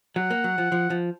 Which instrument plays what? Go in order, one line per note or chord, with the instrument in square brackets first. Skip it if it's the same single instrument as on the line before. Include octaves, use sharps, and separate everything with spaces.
[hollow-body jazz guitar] F#3 [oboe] F#5
[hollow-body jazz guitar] A#3
F#3
F3
F3
F3